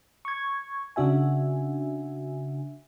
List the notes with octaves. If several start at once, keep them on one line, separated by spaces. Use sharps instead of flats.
C#6 G#6
C#3 D4 F#4 E5 G#5